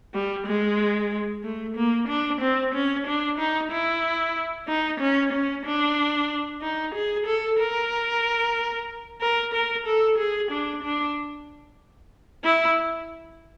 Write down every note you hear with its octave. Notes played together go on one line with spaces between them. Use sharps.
G3
G#3
A3
A#3
D4
C4
C#4
D4
D#4
E4
D#4
C#4
C#4
D4
D#4
G#4
A4
A#4
A#4
A#4
A4
G#4
D4
D4
E4